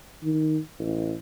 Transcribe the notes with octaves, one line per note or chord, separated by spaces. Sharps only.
D#3
A1